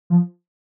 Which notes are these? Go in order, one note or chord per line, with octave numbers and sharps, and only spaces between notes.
F3